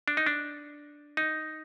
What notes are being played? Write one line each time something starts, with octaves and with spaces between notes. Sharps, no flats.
D4
D#4
D4
D#4